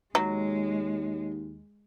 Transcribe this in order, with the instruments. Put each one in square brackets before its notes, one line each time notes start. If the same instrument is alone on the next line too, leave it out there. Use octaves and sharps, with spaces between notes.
[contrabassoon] D#2 [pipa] F#3 [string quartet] G#3